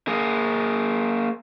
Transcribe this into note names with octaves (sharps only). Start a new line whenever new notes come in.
A#3 G#4